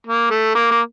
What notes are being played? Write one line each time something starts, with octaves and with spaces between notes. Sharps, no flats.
A#3
A3
A#3
A#3